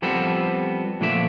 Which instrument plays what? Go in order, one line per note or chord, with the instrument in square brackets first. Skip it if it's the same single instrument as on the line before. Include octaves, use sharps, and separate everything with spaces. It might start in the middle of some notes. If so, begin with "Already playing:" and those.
[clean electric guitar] F3 G3 B3 C4 A4
A#2 D3 F3 A3 D5 E5